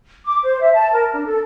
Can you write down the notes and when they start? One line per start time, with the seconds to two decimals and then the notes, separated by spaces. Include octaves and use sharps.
0.25 D6
0.43 C5
0.61 E5
0.74 A5
0.93 A#4
1.13 D4
1.26 A4